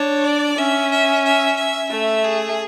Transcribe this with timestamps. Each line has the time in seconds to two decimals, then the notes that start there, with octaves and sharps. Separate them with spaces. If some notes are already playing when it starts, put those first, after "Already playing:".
Already playing: D4 C#5
0.25 D5
0.58 C#4 E5
0.91 E5
1.25 E5
1.57 E5
1.90 A3 E5
2.24 G#4